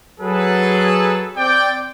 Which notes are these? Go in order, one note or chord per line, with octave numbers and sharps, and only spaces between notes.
F#3 G#4 A4 B4
C4 D5 G5